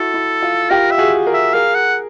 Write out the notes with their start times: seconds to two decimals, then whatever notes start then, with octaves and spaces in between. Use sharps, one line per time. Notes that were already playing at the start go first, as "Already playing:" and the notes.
Already playing: E4 F#4 A4
0.14 E4
0.42 F4
0.70 F4 G4 A#4
0.91 E5
0.98 F#4 G#4
1.26 G#4 A#4
1.34 E5
1.54 G#4 A#4 F5
1.75 F#5